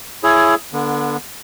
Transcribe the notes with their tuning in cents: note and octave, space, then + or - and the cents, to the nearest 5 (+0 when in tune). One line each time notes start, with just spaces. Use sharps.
E4 +20 G#4 +15 C#5 +0
D3 +0 B3 -35